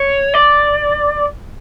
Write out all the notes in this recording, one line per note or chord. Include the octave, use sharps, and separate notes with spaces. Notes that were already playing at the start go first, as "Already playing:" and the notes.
Already playing: C#5
D5